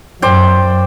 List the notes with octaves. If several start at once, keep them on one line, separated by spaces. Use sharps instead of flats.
F#2 C5 D5 G5